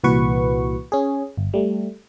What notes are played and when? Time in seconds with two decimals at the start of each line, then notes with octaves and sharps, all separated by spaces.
0.03 C2 A#2 E3 F#4 B4 C#6
0.92 C#4 G#4
1.37 G1
1.54 G3 A3